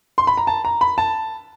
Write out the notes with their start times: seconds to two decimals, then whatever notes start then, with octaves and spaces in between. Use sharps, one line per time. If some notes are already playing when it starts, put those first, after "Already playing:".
0.18 C6
0.27 B5
0.37 A#5
0.47 A5
0.65 A#5
0.81 B5
0.98 A5